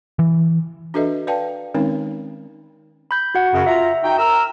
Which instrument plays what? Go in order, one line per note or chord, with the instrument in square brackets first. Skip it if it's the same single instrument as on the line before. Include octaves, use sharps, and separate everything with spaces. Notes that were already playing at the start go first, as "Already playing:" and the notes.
[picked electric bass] E3
[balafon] D4 F#4 A4 B4 D#5 E5
B4 D5 F5 G5 A5
D#3 G#3 C4 C#4 D#4 C#5
[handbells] B5 G6
F#4 F#5
[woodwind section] F#2 C#3
[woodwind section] F4 A#5 [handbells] E5
[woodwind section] D#4 F#4 G5
A#4 E6